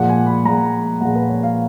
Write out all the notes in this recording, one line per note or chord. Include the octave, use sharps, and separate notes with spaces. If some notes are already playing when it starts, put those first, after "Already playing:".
Already playing: A#2 F3 G#3 F#5
G#5
B5
A#2 F3 G#3 A#5
A#2 F3 G#3 F#5
B4
C#5
F5